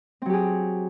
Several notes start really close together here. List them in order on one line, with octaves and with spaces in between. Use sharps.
C4 F#3 G4 G#4